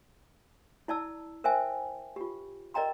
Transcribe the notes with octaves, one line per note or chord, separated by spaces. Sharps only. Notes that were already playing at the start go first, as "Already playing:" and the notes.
E4 D5 A5 E6
A#4 C5 E5 G5 G#5
F4 G4
A#4 D5 D#5 G5 A#5 C6